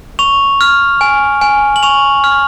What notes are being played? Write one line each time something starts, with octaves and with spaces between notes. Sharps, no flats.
C#6 F7
F6
G#5
G#5
F#7
C#6 F7
F6